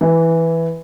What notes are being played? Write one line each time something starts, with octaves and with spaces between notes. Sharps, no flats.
E3